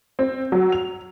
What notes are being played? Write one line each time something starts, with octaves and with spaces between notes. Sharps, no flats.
C4
F#3
F7